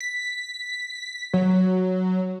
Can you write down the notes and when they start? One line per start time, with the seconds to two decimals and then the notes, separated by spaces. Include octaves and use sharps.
0.01 B6
1.34 F#3